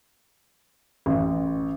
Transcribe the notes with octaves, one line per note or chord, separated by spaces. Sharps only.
A1